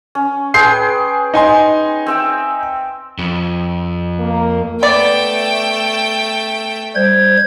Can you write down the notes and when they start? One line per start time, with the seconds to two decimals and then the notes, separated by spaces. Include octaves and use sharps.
0.15 C#4
0.54 G#4 B4 G5 C6 G6 C7
1.34 D#4 G#5 C6
2.07 C4 E5 G5
3.19 F2
4.19 A#3
4.83 A3 B3 D5 G5
6.95 G3 C5 G#6